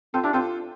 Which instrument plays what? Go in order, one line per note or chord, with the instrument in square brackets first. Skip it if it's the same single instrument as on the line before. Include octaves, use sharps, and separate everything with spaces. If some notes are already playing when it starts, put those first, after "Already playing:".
[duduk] C4 [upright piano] F4 A4
[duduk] D4 [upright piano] E4 G4
[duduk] C4 [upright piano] F4 A4